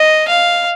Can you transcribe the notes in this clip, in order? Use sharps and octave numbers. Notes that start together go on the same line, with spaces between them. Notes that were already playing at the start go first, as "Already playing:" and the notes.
Already playing: D#5
F5